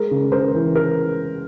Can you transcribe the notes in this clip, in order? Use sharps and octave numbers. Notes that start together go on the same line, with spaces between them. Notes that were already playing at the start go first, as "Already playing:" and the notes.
Already playing: G#3 A#4
C#3
C#3 A#4 C5
E3
A#4